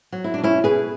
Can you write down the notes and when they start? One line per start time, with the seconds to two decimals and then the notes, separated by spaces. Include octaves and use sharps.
0.12 F#3
0.24 E4
0.34 D4
0.38 B2
0.43 C#4 E4
0.64 B2 G#4 B4